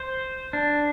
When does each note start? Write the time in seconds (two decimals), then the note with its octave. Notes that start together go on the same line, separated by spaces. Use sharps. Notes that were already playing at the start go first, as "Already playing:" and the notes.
Already playing: C5
0.53 D4